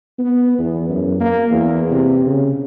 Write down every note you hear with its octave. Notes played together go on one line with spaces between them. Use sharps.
B3
E2
F#2
A#3
E2
C3
C#3